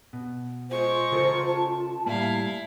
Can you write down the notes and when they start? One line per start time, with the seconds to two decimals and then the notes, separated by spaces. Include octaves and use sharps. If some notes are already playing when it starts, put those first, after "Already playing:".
0.13 B2
0.71 G#3 F4 C5 C#6
1.12 C#3 A4 A#4
1.47 A5
2.06 A2 G3 A#3 E4 F5